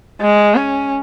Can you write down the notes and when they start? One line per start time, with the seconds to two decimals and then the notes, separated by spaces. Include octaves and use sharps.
0.21 G#3
0.55 C#4